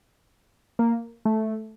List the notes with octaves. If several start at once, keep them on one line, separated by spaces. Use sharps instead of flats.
A#3
A3